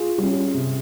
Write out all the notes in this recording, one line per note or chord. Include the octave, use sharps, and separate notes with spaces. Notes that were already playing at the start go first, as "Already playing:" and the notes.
Already playing: F4 G#4
G3 C#4
C3